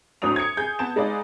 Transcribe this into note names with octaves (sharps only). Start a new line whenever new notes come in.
D2 A2 F#3 D4 D#6 F7
G#6 C#7
G#4 G6
B3 A5 E7
G#3 D#4 B4 D5 F5